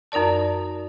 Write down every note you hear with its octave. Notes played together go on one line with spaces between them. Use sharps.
F#2 D#4 A#4 D5 A5